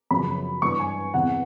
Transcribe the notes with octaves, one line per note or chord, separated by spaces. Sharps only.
F#2 C#3 F3 B5
G2 E3 C#6
G#5
E2 C3 E3 F#5